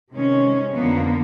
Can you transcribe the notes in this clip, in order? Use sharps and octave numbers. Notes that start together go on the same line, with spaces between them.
C3 D#3 G#3 C#4
F2 D3 F3 A#3 B3